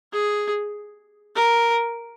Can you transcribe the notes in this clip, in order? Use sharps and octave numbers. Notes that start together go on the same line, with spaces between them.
G#4
A#4